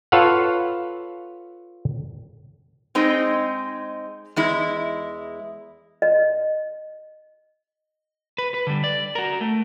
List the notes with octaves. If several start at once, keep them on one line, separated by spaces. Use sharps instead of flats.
F4 A4 B4 C#5 F5 F#5
G#3 C4 D#4
E2 G#3 E4
D#5
B4
B4
D3 G3
D5
F#4 A#4
A3